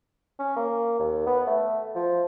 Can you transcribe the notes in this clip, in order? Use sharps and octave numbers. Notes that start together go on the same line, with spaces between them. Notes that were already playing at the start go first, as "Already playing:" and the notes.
C#4
A#3
D#2
B3
A3
F3